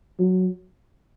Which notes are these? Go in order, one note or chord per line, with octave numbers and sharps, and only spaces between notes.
F#3